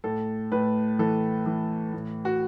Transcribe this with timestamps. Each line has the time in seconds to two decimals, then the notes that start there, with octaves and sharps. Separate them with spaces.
0.04 A2 A4
0.52 A2 B4
0.99 E3 A4
1.46 E3
1.93 A2
2.25 F#4